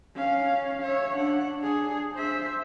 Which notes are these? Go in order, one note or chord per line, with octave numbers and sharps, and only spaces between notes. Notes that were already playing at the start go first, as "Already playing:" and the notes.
C#4 F5
C#5 E5
D4 F#5
D4 G#4
C5 E5